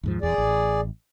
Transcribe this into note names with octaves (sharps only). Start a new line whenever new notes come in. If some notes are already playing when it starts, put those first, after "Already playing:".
D#2 G#2 F3
D#1 E2 G#4 D5
A1